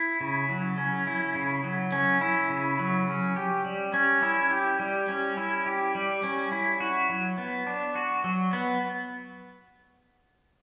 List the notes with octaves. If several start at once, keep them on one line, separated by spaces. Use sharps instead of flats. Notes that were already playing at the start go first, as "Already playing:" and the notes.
Already playing: E4
C#3
F#3
C#4
E4
C#3
F#3
C#4
E4
C#3
F#3
C#4
G4
G3
C#4
E4
G4
G3
C#4
E4
G4
G3
C#4
E4
F#4
F#3
B3
D4
F#4
F#3
B3